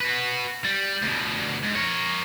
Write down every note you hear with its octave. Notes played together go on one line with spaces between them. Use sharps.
F#4 B4
G3
D2 B2
G#2
A#4 C#5